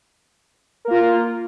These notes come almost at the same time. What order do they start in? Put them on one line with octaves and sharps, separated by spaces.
A#4 A#3 F4